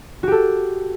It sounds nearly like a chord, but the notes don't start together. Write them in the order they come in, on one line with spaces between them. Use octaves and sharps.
F#4 G4 A4